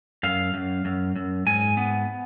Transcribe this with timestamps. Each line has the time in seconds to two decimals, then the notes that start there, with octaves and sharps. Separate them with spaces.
0.23 F#2 F5
0.54 F#2
0.85 F#2
1.16 F#2
1.46 G#2 G#5
1.77 B3